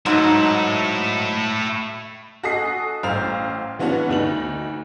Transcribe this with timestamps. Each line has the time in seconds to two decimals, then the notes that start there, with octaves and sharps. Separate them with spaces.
0.06 G#2 F#3 A3 D#4 E4
2.43 F#4 A4 D#5 G#5 D#6 C7
3.03 A1 C5 F5 F7
3.79 E3 B3 C#4 D4 F#4
4.09 D2 D#4 F#7